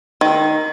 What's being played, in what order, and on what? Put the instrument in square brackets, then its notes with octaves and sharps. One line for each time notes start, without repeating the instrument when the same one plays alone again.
[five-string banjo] D#3